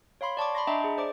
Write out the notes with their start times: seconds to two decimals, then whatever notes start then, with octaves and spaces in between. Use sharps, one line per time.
0.21 C#5 F5 B5 C6
0.37 D5 A5 C#6 D6
0.55 B5 C6 A#6
0.67 D4 D#5 E5 G5 A5 A#5
0.80 G#4 D#5
0.98 C5 D5 D6